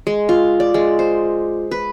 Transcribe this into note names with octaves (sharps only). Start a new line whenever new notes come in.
G#3
F4
D5
G#3
C5
B4